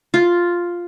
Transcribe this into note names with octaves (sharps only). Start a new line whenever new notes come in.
F4